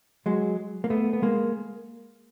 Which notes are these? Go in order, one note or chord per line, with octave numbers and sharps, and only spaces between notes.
F#3 G#3
A#3
A3 B3
B3
G#3 A#3